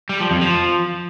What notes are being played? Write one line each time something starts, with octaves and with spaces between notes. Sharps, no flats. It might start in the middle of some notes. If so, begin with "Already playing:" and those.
G3
F3
F2
F3